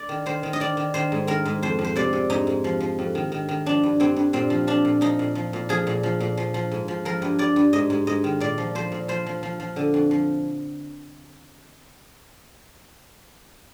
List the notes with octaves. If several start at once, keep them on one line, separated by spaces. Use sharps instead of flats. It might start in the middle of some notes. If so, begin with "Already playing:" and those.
Already playing: D5
D#3
D#3 C5
D#3
D#5
D#3 D5
D#3
D#3 C5
G#2
D#3 A#4
G#2
F2 C5
F2
C5
C3 D5
C3
G#2 D#4
G#2
F3
F3
F2
D#3
D#3
D#3
F3 D4
G2
G2 C4
G2
A#2 C4
F3
F3 D4
A#2
F3 D#4
A#2
F3
A#2
F3 G#4
A#2
F3
A#2
F3
F3
G#2
F3
F3 A#4
G2
G2 D5
G2
G#2 D#5
G#2
G#2 D#5
D#3
A#2 D5
F3
F3 C5
A#2
F3 C5
F3
F3
F3
D3
F2
F3